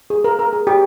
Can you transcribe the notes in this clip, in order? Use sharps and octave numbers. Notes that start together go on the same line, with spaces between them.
G#4
A#4
A#4
G#4
G4